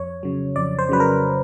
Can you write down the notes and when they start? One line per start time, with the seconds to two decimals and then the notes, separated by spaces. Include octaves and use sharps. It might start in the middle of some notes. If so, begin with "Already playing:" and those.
Already playing: F2 C#5
0.23 C#3 F#3
0.56 F2 D5
0.79 C5
0.89 C#3 F#3 B4
1.00 A#4